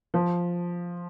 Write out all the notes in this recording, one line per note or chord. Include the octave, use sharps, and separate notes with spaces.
F3